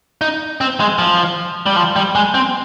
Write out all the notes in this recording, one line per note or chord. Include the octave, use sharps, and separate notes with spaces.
D#4
C4
G#3
F3
G3
F3
G3
G#3
C4